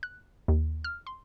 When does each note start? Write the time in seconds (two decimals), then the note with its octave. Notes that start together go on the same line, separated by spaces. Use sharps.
0.03 F#6
0.48 D#2
0.84 F6
1.07 C6